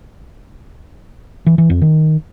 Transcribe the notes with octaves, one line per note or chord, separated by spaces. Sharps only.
E3
E3
F2
D#3